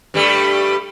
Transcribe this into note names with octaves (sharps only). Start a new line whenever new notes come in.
G2 G3 A3